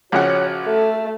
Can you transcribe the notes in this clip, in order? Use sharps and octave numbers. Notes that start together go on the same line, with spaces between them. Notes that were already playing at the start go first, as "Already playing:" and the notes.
A#1 C#3 F#4 C#5 F#5
A3 A4